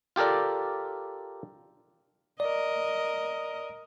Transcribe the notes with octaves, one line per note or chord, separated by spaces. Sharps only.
F4 G4 A4 A#4 D5
A#4 D5 D#5